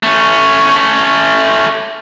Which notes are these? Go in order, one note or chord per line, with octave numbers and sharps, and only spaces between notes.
A3 C#4